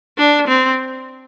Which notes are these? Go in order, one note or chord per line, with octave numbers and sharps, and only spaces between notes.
D4
C4